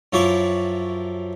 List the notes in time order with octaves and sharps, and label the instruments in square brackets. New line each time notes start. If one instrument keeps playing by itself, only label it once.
[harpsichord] F#2 F3 E4 C#5 C#6 D6